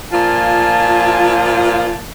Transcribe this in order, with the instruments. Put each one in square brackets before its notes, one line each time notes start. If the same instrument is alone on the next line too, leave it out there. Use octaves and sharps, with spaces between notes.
[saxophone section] A#2 F3 F4 [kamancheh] G#5 A5